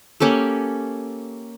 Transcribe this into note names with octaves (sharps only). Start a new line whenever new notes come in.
A#3 C#4 G4 A4